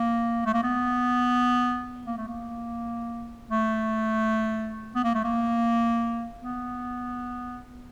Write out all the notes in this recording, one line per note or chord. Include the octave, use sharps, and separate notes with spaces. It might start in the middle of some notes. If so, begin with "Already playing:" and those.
Already playing: A#3
A3
A#3
B3
A#3
A3
A#3
A3
B3
A#3
A3
A#3
B3